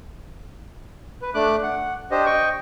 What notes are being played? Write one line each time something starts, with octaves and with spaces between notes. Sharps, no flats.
B4
A3 D4 D6 F#6
F#5
D4 G4 C5 D#5
D#5 G5 C#6